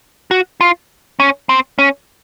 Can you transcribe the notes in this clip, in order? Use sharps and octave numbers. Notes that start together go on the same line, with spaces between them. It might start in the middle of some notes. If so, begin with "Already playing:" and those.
F#4
F4
C#4
C4
C#4